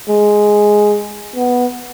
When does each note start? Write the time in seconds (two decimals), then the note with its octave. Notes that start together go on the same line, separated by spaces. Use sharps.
0.08 G#3
1.36 B3